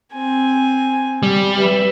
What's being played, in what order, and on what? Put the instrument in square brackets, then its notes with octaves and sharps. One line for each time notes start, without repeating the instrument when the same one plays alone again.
[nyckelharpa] C4 G#5
[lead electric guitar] G3
[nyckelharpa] B4 E5